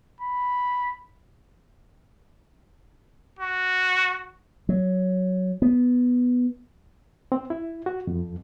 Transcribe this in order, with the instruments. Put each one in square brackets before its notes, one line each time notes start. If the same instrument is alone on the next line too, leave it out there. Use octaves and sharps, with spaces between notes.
[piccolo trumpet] B5
[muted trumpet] F#4
[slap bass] F#3
B3
[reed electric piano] C4
E4
F#4
F2